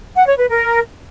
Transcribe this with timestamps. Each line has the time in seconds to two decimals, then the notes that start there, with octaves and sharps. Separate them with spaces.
0.15 F#5
0.26 C#5
0.37 B4
0.49 A#4